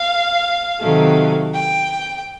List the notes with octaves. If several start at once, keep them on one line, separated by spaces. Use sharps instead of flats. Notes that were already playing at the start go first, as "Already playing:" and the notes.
Already playing: F5
C3 D#3 F#3 A3
G5